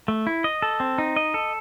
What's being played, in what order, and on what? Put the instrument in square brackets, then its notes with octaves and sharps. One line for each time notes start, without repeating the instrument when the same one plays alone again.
[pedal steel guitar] A3
E4
D#5
A4
C4
D#4
D#5
A4